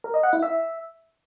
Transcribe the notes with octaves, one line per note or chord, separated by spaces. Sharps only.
A#4
D#5
F#5
E4
E5